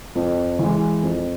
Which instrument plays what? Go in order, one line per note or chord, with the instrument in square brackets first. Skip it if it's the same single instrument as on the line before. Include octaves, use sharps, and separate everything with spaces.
[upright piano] F2
E3 G#3
F2